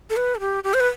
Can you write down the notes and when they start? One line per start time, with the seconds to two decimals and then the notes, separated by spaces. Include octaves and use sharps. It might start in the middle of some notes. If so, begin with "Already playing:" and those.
0.10 A4
0.17 B4
0.35 A4
0.40 G4
0.64 G4
0.74 C5
0.80 B4